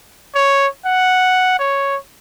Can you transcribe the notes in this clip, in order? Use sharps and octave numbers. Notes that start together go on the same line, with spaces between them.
C#5
F#5
C#5